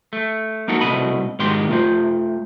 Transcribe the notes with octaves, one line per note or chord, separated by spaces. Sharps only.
A3
A#3 D#4 F#4 A4
C2 B2 A3 D#5 B5
G#2 B2 D#3 G4 C6
A3 F4 C5